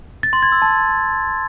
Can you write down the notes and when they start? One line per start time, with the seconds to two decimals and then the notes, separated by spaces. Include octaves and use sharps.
0.23 A6
0.33 C6
0.43 G#6
0.52 E6
0.62 A5